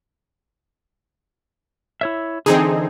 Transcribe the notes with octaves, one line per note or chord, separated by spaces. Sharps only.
E4 C#5 E5
D3 E3 C4 D#4 G#4